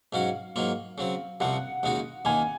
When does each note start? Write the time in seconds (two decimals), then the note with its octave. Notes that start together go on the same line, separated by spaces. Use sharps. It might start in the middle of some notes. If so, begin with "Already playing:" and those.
0.13 G#2 F#3 C#4 F#4 F5
0.56 G#2 F#3 A#3 F4
0.98 C#3 F#3 C4
1.40 C2 C3 F3 C4 F#5
1.83 D#2 C#3 G#3 D#4 F#4
2.25 D#2 D#3 A#3 G#5